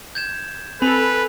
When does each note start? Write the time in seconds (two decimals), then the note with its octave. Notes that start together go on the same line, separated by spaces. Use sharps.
0.15 G6 G#6 E7
0.82 C4 A4 B4 G#5 B5 F7